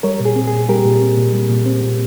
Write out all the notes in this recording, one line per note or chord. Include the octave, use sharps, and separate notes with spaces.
G3 A#4 C#5
A#2
G#4
C4
G#4
A#2
G3 G4 A#4
A#2
C4
A#2
G3
A#2
C4
A#2